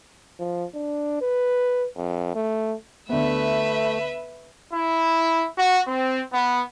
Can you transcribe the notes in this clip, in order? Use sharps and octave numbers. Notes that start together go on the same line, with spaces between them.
F3
D4
B4
F2
A3
D2 A3 B3 B4 E5
E4
F#4
C4
B3